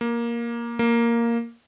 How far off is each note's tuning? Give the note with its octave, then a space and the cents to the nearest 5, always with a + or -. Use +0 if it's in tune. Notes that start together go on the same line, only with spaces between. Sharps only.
A#3 +10
A#3 +0